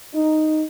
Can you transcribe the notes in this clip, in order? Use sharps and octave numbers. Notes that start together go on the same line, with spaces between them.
D#4